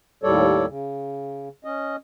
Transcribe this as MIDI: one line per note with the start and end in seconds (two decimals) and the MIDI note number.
0.23 0.66 39
0.23 0.66 45
0.23 0.66 55
0.23 0.66 69
0.23 0.66 73
0.23 0.66 74
0.67 1.49 49
1.64 1.96 61
1.64 1.96 75